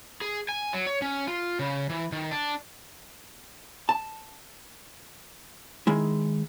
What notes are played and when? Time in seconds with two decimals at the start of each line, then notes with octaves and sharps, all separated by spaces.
0.21 G#4
0.49 G#5
0.73 F#3
0.87 C#5
1.02 C#4
1.27 F4
1.59 C#3
1.90 E3
2.12 D#3
2.31 D4
3.89 A5
5.87 D#3 G#3 E4